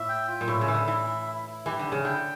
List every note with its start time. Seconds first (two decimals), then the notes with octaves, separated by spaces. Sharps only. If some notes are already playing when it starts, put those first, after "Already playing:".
Already playing: A2 E5
0.09 G5
0.28 F4
0.41 A#2
0.48 A2 E5
0.61 C#3
0.67 E3 E4
0.74 D3
0.87 E3 E5
1.06 E4
1.26 E4
1.46 E4
1.66 E3 G4
1.79 D3
1.85 E4
1.92 C#3
2.05 D3 G5